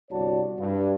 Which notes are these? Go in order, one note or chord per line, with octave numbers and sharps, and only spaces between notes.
G1 C2 F#4 C#5 D5 A5
G2